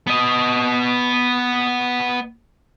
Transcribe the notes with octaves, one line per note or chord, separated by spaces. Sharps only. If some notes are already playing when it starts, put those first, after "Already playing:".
B3 D#5